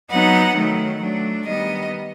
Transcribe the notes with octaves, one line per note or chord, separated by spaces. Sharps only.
F#3 B3 D#4 F#5
D#3 F#3 A3
F#3 A3 D4
D#3 G3 B3 D#5